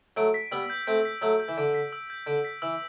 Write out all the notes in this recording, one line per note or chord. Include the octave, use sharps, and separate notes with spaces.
F#3 A3 D7
B6
G3 B3 E6
G6
A3 C4 D7
B6
F#3 A3 E6
G6
E3
D3 D7
B6
E6
G6
D3 D7
B6
E3 E6